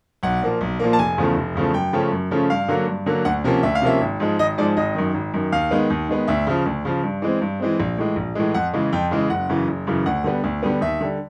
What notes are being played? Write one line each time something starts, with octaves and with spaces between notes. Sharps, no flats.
B1 F#5
A#2 F3 A#3
B1
A#2 F3 A#3
A5
F1 G#5
E2 C#3 F3 A3
F1
E2 C#3 F3 A3
F#2 G5
C#3 F3 A3 C#4
F#2
C#3 F3 A3 C#4
G2 F5
D3 F#3 A#3
G2
D3 F#3 A#3
D2 F#5
C3 F3 A#3 C#4
D2 E5
F5
C3 F3 A#3 C#4 E5
G#1
G#2 F3 G#3
G#1 D#5
G#2 F3 G#3 D5
G#1 D#5
F#2 D#3
G#1
F#2 D#3
D#2 F5
D#3 G#3 B3
D#2
D#3 G#3 B3
D2 E5
C#3 F3
D2
C#3 F3
G2
E3 G#3 C4
G2
E3 G#3 C4
A#1
A2 E3 G#3
A#1
A2 E3 G#3
F2 F#5
C#3 E3 G#3
F2 G5
C#3 E3 G#3
F#1 F#5
F#2 C#3 E3
F#1
F#2 C#3 E3
D2 F#5
D3 G3 B3
D2
D3 G3 B3
D#2 E5
D3 G3